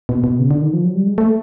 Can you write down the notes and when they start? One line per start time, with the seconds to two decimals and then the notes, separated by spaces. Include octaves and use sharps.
0.09 B2
0.24 B2
0.40 C#3
0.51 D3
0.61 D#3
0.73 F3
0.84 F#3
0.95 G3
1.07 G#3
1.18 A3